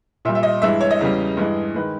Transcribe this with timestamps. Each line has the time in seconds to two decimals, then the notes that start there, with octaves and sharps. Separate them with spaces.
0.25 A#2 E5
0.29 G3
0.35 E5
0.43 D#5
0.62 G2 E3 G#3 E5
0.81 C#5
0.91 D#5
1.01 E2 C#3 G3
1.37 G2 E3 G#3
1.75 D#3 G#3 B4